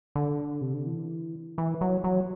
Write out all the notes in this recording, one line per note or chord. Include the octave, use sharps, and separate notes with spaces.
D3
C3
D3
E3
E3
F#3
F#3